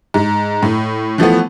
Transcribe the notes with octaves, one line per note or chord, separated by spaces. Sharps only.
G#2
A2
E3 F3 A3 B3